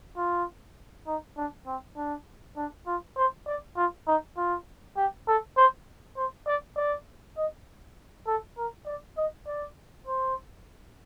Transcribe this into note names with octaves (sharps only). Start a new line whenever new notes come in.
F4
D#4
D4
C4
D4
D4
F4
C5
D5
F4
D#4
F4
G4
A4
C5
C5
D5
D5
D#5
A4
A#4
D5
D#5
D5
C5